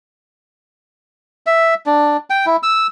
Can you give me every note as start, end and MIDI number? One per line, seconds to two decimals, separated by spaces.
1.46 1.74 76
1.86 2.17 62
2.30 2.46 79
2.46 2.56 64
2.63 2.87 88